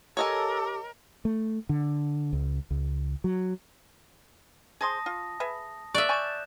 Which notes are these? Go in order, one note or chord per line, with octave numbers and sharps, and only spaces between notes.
G4 A4 A#4 C#5 D#5 G#5
A3
D3
C#2
C#2
F#3
G#4 C5 A5 C6 D#6 A#6
F4
G#4 B4 E5
A#3 D5 E5 C#6 F#6
G#5 A5 C#6 G6 A6 E7